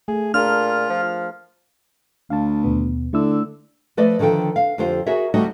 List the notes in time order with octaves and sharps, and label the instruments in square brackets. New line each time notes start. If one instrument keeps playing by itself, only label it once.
[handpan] A3 [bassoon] G#4
[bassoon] A#2 [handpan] D4 G#4 A#4 [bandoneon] F4 [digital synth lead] F6
[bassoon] F3
[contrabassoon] D2 [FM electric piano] F5 A5
[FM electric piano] D#2 B2 B3
[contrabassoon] D3 [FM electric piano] A3 E4 E6
[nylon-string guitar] F3 A3 B4 D5 D#5
D3 D#3 F3 A4 G5
F5
F2 D3 F4 G4 C5
F#4 G#4 A#4 C#5 E5
D2 G3 A3 D#4 F#4 D#5